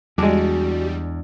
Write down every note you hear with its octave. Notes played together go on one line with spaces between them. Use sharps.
E2 G3 G#3 D4 F#4